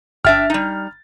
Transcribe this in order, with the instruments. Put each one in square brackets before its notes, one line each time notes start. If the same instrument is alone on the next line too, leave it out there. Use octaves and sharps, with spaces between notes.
[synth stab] G1 [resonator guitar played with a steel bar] D4 E5 G5 [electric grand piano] F6 A6
[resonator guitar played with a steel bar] G3 D#4